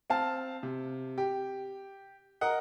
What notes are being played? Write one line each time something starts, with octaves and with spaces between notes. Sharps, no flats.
C4 F5 A5
C3
G4
A#4 D#5 F#5